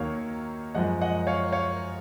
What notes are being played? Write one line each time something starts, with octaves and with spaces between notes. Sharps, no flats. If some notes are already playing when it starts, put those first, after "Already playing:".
Already playing: D#2 D#3 F#3 A#3 C#5 F5
F#2 F3 G#3 D#5 F#5
D#5 F#5
C#5 F5
C#5 F5